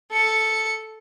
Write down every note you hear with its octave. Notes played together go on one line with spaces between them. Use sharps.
A4 C#7